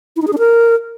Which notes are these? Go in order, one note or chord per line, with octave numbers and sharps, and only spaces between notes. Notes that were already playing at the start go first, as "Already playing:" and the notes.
E4
D#4
G#4
D4
A#4